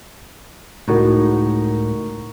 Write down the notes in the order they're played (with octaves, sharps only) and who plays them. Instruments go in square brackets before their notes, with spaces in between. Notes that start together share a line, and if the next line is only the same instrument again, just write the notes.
[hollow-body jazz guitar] C#2 A2 [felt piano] D#4 F#4 A#4